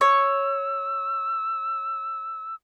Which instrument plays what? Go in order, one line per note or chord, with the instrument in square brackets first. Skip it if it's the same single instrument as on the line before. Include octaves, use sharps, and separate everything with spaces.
[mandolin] C#5 [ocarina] E6